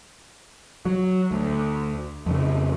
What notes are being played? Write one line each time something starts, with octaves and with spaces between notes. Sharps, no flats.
F#3
D2
F2 C#3